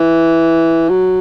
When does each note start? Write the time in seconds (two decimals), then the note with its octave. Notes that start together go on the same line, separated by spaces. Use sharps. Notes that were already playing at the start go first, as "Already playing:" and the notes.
Already playing: E3
0.89 F#3